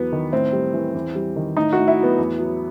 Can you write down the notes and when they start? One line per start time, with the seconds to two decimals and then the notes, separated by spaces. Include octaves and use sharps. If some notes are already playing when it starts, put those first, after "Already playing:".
Already playing: E2 F#3 B3
0.12 D#3
0.32 A2 C4
0.53 G3
0.73 E3
0.95 E2
1.15 G3
1.36 D#3
1.57 A2 D#4
1.73 A2 F#4
1.88 E4
1.98 F#3
2.03 B3
2.18 E2
2.40 F#3